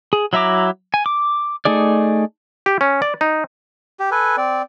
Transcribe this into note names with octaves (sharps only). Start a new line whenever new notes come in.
G#4
F#3 E4 E5 A#5 D6
G#5
D6
A3 D#4 G#4 D5
G4
C#4
D5
D#4
G4
A4 B4 G#5
C4 D5